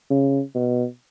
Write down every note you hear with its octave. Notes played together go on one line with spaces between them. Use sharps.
C#3
B2